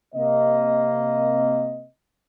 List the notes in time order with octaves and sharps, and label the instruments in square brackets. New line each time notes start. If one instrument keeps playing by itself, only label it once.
[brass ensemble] C3 A#3 D#5